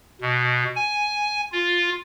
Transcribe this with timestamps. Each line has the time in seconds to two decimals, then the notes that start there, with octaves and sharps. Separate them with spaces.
0.22 B2
0.76 G#5
1.52 F4